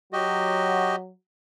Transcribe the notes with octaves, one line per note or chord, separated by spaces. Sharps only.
F#3 F#4 G4 D#5